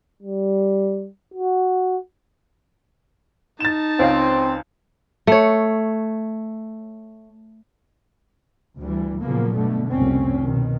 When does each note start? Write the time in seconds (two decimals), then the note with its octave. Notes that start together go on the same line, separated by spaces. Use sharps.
0.22 G3
1.34 F#4
3.60 D#4 A5 A6 E7
3.99 C#2 C4 C#5 F5
5.27 A3 C#5
8.79 D2 E3 G3
9.21 A#2 C#3 F3 F#3 A#3 B3
9.56 G2 B2 D3 A3
9.91 F1 C2 A#2 C4 C#4
10.40 B2 D#3